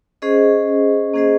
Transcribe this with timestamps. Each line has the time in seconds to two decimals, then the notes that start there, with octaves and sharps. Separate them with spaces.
0.22 C#4 G#4 C5 D#5
1.14 A#3 C#4 G#4 C5 D#5